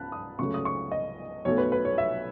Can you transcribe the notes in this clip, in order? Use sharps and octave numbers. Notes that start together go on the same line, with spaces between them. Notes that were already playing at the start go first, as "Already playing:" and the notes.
Already playing: C#2 A5 B5 F#6
D#6
C#2 C#3 F#3 A3 C#6
D#6
C#6
D#5
B1 B2 F#3 A3 C#5
B4
B4
C#5
E5